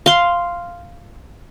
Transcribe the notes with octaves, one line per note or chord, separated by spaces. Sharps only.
F5 C6